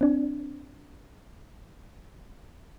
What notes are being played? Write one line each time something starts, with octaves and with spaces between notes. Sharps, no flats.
C4 D4